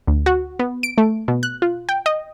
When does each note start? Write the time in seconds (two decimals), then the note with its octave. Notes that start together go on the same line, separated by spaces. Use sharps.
0.07 D2
0.26 F#4
0.59 B3
0.83 D7
0.98 A3
1.28 B2
1.43 F#6
1.62 F4
1.89 G5
2.06 D#5